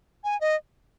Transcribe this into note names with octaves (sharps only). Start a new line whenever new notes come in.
G#5
D#5